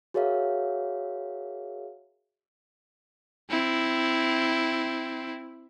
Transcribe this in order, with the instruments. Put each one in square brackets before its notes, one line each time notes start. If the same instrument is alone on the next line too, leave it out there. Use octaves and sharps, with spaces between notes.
[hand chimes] F#4 G#4 A#4 C#5 E5 F5
[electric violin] C4 E4